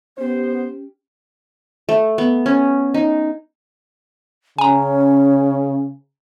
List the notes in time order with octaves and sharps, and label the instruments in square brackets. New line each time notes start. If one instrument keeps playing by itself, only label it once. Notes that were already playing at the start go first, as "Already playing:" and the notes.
[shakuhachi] B3 [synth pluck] C#4 G4 [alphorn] C5
[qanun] A3
B3
C#4
D#4
[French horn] C#3 [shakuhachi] C#4 [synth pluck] G#5 A#5